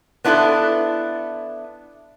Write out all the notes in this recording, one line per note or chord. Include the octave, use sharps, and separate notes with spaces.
B3 D4 E4 F4 A4